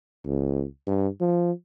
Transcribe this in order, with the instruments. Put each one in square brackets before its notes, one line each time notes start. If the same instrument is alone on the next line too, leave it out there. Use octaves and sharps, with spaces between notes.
[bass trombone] C#2
G2
F3